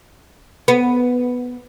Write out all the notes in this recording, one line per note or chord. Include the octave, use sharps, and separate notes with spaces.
B3